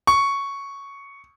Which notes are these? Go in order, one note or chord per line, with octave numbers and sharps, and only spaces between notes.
C#6